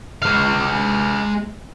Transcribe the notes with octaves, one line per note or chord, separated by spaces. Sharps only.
G#3 F5